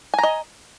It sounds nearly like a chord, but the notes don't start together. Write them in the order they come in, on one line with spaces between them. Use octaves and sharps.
G#5 A#5 D#5